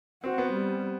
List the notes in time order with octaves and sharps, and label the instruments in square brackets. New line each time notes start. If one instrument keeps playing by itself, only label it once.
[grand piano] C4 [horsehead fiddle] F#4
[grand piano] B3
[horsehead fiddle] G3